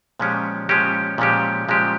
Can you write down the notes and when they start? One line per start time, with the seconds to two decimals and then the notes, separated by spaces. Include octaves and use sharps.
0.20 A#2 F3 G#3 C#4 G4
0.69 A#2 F3 G#3 C#4 G4
1.18 A#2 F3 G#3 C#4 G4
1.68 A#2 F3 G#3 C#4 G4